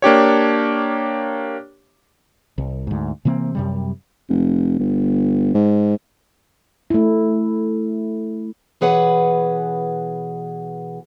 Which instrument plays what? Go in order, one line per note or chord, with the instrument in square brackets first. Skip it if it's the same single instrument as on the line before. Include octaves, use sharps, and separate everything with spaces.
[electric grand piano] A#3 D4 G4 C#5
[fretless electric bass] C2
D2 G#2
C3 E3 A#3 C4
F#2 C3 G3
[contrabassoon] F1
G1
G#2
[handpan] A3 E4
[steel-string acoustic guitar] B2 E3 G#4 B4 C#5 F#5